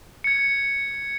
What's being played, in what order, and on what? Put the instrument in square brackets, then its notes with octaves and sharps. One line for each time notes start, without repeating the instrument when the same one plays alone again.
[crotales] G#6 C#7